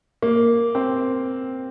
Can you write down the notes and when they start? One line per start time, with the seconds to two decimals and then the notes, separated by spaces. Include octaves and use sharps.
0.22 A#3
0.75 C4